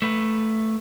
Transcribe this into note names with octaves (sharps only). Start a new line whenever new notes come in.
A3 B4